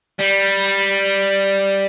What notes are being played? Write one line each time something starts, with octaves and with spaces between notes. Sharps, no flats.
G3